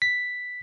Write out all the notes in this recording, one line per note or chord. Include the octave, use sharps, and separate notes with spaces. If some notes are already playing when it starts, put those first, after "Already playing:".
B6